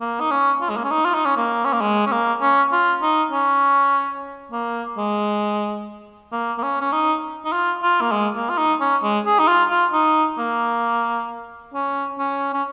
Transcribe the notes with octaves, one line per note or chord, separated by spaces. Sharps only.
A#3
D#4
C#4
F4
G#3
A#3
C#4
D#4
F4
D#4
C#4
A#3
C#4
A#3
G#3
C#4
A#3
C#4
F4
D#4
C#4
A#3
G#3
A#3
A#3
C#4
C#4
D#4
D#4
F4
F4
A#3
G#3
A#3
F4
D#4
C#4
G#3
G#4
D#4
F4
F4
D#4
A#3
C#4
C#4
C#4